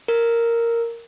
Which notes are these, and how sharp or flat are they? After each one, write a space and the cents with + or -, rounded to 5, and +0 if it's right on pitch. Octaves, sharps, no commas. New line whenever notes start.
A#4 -5